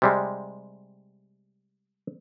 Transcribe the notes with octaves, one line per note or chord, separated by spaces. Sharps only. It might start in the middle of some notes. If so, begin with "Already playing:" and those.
C3 G3 G#3